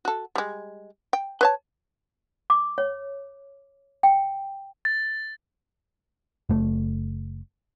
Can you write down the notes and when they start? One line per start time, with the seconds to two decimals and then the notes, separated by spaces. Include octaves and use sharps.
0.05 F#4 A4
0.35 G3 G#3
1.13 G5
1.41 B4 C#5 A5
2.50 D6
2.78 C#5
4.03 G5
4.85 A6
6.49 F#1 A3